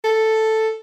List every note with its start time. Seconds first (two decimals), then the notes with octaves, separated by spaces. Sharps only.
0.04 A4